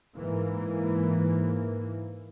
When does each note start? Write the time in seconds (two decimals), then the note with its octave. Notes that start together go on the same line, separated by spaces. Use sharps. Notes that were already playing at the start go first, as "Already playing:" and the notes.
0.17 G#2 E3 A#3